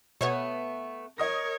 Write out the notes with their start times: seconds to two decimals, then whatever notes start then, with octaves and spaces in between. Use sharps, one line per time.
0.21 B2 A3 B3 C#5
1.18 A#4 C#5 D#5 D#6 A#6